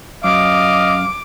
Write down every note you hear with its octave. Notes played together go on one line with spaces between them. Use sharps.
F#2 D#5 F5 D6